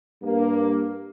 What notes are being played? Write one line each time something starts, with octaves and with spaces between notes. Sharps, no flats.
G2 A#3